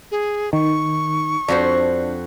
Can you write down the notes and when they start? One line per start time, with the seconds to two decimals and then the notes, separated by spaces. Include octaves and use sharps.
0.11 G#4
0.53 D#3 C#6
1.48 F2 D4 F#4 C5